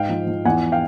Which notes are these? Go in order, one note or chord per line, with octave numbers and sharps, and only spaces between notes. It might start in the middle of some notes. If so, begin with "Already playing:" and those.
Already playing: G#2 F5 G5
F3
F3
E2 F#5 G#5
F5 G5